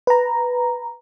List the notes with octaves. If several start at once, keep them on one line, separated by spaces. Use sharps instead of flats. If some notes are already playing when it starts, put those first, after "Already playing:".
B4 A#5